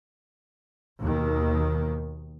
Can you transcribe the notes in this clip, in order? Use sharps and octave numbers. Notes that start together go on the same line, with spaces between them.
D#2 B2 D#3